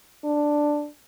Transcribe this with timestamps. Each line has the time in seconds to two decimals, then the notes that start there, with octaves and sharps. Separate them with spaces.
0.24 D4